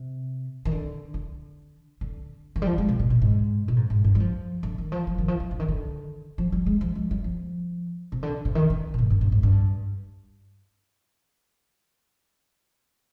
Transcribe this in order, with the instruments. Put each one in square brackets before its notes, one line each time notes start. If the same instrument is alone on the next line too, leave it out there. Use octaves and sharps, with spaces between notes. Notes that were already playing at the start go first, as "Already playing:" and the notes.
Already playing: [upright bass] C3
D#3
D3
D3
D3
D#3
G3
F3
G#3
C3
B2
B2
G#2
B2
G#2
G#2
G2
G3
F3
D3
D#3
F3
F3
D#3
F3
D#3
D3
D#3
D3
F3
G3
G#3
F3
G#3
G3
F3
C3
D3
C3
D#3
D3
B2
G#2
G2
G2
G#2
G2